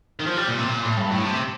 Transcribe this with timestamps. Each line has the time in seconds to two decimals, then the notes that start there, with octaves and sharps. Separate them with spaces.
0.19 D#3
0.26 F3
0.37 G3
0.48 A#2
0.59 C3
0.69 A#2
0.84 A2
0.97 G2
1.11 A2
1.26 C3